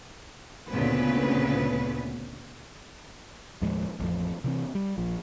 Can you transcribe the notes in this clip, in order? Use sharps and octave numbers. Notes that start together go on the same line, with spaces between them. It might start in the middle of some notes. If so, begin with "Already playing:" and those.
D2 A#2 C#3 B3 C4 B4
D#2 A2 F3 G#3
A1 F2 F3
C3 E3 C4
G3
A#1 F3